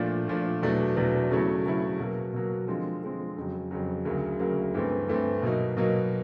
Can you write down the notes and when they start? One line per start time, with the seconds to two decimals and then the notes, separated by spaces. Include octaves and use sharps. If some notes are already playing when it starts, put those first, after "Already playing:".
Already playing: A#2 F3 A3 D4
0.28 A#2 F3 A3 D4
0.62 E2 B2 F#3 A3 D4
0.97 E2 B2 F#3 A3 D4
1.30 C#3 F#3 A3 C#4 E4
1.65 C#3 F#3 A3 C#4 E4
1.99 B2 F#3 A#3
2.33 B2 F#3 A#3
2.68 D3 F3 G#3 C4
3.02 D3 F3 G#3 C4
3.36 F2 C#3 F#3
3.71 F2 C#3 F#3
4.05 D2 C#3 F#3 A#3
4.39 D2 C#3 F#3 A#3
4.74 G2 E3 A3 C4
5.08 G2 E3 A3 C4
5.42 B2 F#3 A#3 D#4
5.77 B2 F#3 A#3 D#4